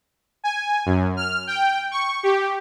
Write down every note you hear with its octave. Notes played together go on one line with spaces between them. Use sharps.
G#5
F#2
F6
G5
C#6
G4